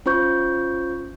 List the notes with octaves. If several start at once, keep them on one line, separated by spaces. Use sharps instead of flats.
C#4 F4 C5 C#6 G6